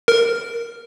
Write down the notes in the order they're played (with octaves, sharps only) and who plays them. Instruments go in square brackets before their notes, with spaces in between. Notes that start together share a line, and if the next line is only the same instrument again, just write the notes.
[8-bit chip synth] A#4